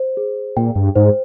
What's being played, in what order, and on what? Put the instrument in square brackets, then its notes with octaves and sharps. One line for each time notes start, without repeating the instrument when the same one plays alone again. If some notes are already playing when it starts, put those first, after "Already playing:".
Already playing: [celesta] C5
G#4
[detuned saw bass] A#2 [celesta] G5
[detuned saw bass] G2
[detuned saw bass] G#2 [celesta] C5